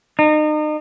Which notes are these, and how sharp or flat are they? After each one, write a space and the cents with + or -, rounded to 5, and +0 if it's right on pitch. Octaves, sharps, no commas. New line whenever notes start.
D#4 -35